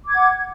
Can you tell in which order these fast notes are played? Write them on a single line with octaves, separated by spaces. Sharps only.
D6 G#6 F#5